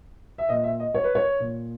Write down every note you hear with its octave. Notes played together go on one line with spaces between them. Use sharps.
E5
A#2 D#5
E5
D#5
C#5
B4
C#5
A#2